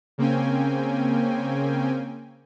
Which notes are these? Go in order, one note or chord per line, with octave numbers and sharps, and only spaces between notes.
C#3 A#3 C4 C#4 G5 G#5